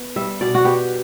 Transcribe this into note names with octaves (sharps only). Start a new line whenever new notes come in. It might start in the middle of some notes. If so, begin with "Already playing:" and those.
Already playing: B3
G3 E5
B2 D5
F#4
B3 G4